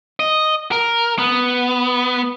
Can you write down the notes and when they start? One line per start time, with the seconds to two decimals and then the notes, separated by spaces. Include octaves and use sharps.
0.20 D#5
0.72 A#4
1.19 B3